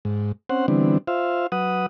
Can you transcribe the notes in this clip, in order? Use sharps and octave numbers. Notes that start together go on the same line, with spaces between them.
G#2
C4 C#4 C5 F#5
D3 E3 G3 B3 C4 D4
F4 C5 E5 F5
F#3 B4 F#5 D#6